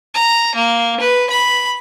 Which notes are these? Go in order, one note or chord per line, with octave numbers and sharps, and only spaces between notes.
A#5
A#3
B4
B5